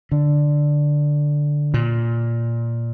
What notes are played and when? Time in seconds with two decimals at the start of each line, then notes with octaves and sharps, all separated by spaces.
0.12 D3
1.74 A#2